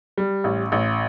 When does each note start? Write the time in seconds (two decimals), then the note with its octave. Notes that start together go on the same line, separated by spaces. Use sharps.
0.18 G3
0.44 A1
0.72 A1